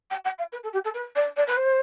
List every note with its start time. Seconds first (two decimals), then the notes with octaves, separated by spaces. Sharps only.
0.10 G5
0.24 G5
0.38 F5
0.52 B4
0.63 A4
0.73 G4
0.84 A4
0.94 B4
1.15 D5
1.36 D5
1.47 B4
1.56 C5